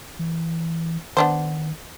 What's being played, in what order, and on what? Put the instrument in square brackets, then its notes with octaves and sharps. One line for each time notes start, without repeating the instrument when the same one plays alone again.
[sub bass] E3
[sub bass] D#3 [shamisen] B3 D4 C5